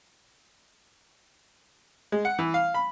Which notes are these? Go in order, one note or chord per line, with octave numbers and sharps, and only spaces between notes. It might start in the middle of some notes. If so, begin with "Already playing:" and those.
G#3
F#5
E3
F5
B5